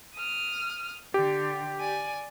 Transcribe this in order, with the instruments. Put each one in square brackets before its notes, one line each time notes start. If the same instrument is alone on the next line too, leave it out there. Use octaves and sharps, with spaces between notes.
[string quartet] D#6 F6
[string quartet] D3 [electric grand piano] G4
[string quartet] D5 G#5